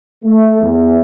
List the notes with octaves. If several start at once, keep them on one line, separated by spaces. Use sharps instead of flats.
A3
E2